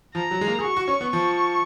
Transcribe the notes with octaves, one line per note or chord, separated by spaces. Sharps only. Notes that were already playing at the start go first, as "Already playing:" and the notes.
F3 A#5
F#3
G#3
A#3
G#4
F#4 C#6
F#4
C#4
B3
F3 C#6